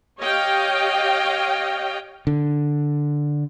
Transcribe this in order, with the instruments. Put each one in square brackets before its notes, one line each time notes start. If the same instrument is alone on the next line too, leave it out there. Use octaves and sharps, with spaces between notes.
[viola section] G4 C#5 D#5 F5 G5
[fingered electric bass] D3